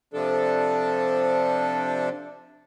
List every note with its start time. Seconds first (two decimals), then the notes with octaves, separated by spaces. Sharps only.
0.14 C3 F3 D4 A4